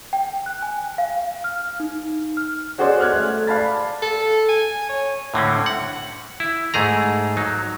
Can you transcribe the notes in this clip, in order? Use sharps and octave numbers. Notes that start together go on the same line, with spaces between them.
G5
F#6
G#5
F5
F6
D#4
F6
C#4 F#4 G#4 C5 D5 D#5
F6 F#6 G#6
A3
D5 F5 A5 B5 A6
A4
G#5
C#5
A2 D3 C4 C#4
F#5
E4
G#2 A3 G#4 A#5
F#3 D#4